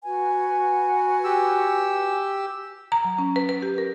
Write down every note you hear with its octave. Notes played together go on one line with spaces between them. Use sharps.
F#4 B4 G#5
G4 E6
A#5
F#3
C#4
B4
B4
G4
A#4